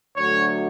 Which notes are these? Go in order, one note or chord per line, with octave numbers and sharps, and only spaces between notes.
D2 D3 F#3 C#5